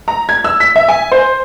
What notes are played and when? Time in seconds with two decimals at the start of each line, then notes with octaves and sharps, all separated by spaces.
0.08 A#5
0.29 G#6
0.44 E6
0.60 B6
0.76 E5
0.89 G#5
1.12 C5